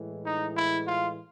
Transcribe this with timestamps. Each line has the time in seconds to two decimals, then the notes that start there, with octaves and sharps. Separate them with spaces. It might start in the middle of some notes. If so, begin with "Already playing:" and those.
Already playing: A2 E3 G#3
0.24 D#4
0.56 E4
0.88 F4